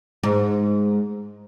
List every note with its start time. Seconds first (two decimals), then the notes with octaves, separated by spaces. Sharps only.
0.23 G#2